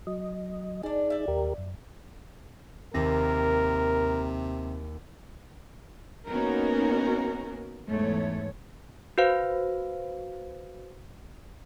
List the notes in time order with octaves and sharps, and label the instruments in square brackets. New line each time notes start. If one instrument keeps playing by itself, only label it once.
[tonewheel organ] F#3 D#5
[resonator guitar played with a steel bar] D4 D5 [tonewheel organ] D#4 G#4
[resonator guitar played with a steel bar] D5 E5
[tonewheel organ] D#2 G4 A#4
F#2
[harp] D#2 A#6 [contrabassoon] C3 [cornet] A#4
[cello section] A#3 B3 C#4 D#4 F#4 A#4
E2 G#2 A3 C#5
[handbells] F#4 B4 C5 F5